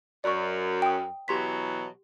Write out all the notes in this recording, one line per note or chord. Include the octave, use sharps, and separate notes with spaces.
F#2 D5 C#6
G5 D#6
B2 E3 F#3 G4 C6 B6